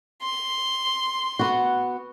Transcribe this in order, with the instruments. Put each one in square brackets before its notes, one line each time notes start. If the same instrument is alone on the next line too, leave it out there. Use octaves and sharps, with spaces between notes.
[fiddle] C6
[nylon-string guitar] B3 F#4